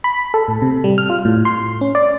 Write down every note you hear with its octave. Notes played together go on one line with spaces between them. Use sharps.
B5
A4
A2
C3
G3
F6
F4
A2
C6
C#4
D5